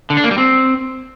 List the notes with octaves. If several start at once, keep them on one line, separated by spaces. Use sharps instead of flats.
D3
D4
A#3
G3
C4